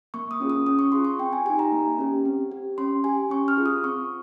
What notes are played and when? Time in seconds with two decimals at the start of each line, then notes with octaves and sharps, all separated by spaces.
0.14 A#3 C#6
0.31 D#6
0.40 C#4 F4 G#4
0.50 D#6
0.66 C#4 D#6
0.79 C#6
0.92 F4 G#4 C6
1.05 C#6
1.19 C4 G5
1.33 G#5
1.45 G4 G#5
1.50 D#4
1.59 A#5
1.72 A#3
1.98 C#4 G4
2.25 C4
2.51 G4
2.78 C#4 C6
3.04 G4 G#5
3.30 C#4 C#6
3.48 F6
3.57 F4 G#4
3.66 D#6
3.84 C4 C#6